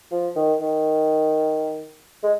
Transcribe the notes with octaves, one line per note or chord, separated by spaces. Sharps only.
F3
D#3
D#3
G#3